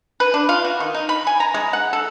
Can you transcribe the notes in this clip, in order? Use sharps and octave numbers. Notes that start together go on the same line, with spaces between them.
B4
D4
F4
F#4
D#3
D#4
B5
G#5
A#5
G#3
F#5
A4